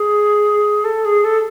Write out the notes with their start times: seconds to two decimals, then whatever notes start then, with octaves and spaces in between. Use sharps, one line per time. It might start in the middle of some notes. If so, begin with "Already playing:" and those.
Already playing: G#4
0.84 A4
1.04 G#4
1.24 A4